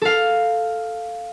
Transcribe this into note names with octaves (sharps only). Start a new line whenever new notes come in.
A4 F5